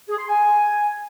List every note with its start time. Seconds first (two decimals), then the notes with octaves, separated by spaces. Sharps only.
0.09 G#4
0.18 C6
0.28 G#5